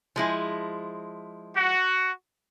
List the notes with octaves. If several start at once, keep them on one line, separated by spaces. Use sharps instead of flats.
F3 G#3 E4
F#4